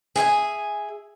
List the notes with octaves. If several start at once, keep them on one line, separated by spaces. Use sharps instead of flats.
G#4 E5 G5 G#5